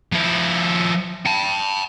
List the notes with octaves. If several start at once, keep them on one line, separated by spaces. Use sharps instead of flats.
F3 E4
G5 A5